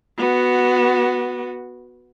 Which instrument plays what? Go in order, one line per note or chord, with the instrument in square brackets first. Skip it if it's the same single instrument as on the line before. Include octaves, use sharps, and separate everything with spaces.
[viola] B3 F#4